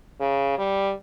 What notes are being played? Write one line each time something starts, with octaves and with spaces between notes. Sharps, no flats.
C#3
G3